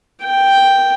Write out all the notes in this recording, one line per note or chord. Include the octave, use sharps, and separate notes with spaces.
G5